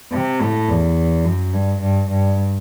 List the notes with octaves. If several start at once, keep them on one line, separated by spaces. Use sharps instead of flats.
C3
A2
E2
F#2
G2
G2
G2